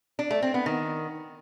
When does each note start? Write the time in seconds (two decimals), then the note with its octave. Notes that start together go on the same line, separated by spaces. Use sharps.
0.19 D4
0.31 A3
0.42 C4
0.54 B3
0.66 D#3